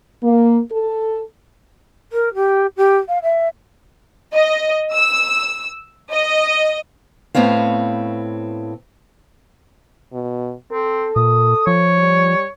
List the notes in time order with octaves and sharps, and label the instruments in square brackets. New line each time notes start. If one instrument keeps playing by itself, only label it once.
[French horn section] A#3
A4
[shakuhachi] A#4
G4
G4
F5
E5
[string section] D#5
E6
D#5
[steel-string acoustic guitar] A2 B3 C4 C#5 F5
[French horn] B2
[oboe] C4 [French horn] A4
[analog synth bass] A#2 [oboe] D#6
[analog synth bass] F3 [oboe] C#5
[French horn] G3